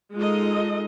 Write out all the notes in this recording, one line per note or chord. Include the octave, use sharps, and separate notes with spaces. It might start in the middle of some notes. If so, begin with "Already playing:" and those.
G#3 D#4 F4 A4 D#5